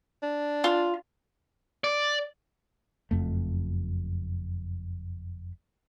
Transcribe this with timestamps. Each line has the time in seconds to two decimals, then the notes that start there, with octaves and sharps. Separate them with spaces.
0.23 D4
0.64 F4
1.84 D5
3.11 F#1 F2 A3